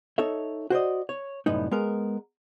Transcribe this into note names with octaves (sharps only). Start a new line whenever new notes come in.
D#4 A4 C#5 E5
F#4 C5 D5 D#5
C#5
C2 F#2 A2 B3 D#4
G#3 B3 A#4